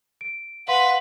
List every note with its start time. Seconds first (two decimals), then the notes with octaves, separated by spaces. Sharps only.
0.21 D7
0.68 B4 F5 F#5 C6 B6